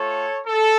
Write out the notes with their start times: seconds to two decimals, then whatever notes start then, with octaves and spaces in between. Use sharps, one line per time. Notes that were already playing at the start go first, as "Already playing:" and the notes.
Already playing: A3 F4 A4 C#5
0.47 A4